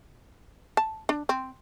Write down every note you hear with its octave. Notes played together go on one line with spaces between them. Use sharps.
A5
D4
C4